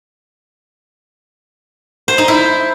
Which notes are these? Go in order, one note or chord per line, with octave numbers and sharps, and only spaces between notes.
C5
D#4
E4